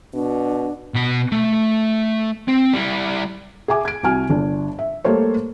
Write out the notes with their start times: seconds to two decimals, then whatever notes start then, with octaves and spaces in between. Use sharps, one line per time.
0.14 B2 D4
0.94 B2 B5
1.32 A3
2.48 C4
2.73 G3 E4
3.68 G#4 E5 G#5 D6
3.85 G#6 D7
4.03 C2 F#4 G#5 F6
4.29 G1 D4
4.79 E5
5.04 G3 A3 A#3 A4 C5 C#5